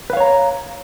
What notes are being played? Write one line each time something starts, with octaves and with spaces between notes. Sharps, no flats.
B4 C#5 F5 A#5